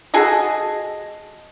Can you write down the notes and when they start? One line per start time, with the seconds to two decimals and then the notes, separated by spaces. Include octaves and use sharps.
0.14 F#4 G#4 A4 D#5